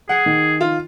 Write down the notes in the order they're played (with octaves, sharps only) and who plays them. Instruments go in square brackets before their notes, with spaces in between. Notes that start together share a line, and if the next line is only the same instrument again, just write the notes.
[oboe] G#4 [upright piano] F#5
[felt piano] D#3
[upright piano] F4